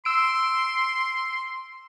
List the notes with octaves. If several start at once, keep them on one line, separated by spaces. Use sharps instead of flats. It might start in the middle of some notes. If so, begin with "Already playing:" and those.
C6 E6 D7